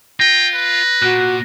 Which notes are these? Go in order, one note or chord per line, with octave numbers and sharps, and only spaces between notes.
F4 G5 A#6
B4
A#2 F#4 F#6